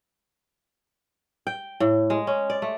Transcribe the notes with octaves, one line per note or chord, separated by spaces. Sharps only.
G5
A2
G#3
C#4
D5
A3